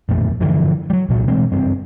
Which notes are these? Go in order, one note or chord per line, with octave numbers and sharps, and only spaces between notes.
A1 F2 A#2 A3
G2 D3 E3 F3
F#3 G3
C2 A#2 F#3
B2 E3 G#3 C4
F#1 G2 C4